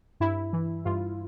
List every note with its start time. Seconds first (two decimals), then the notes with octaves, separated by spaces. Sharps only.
0.20 G2 E4
0.53 E3
0.85 G2 F4